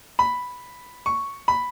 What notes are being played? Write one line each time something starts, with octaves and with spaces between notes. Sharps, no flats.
B5
C#6
B5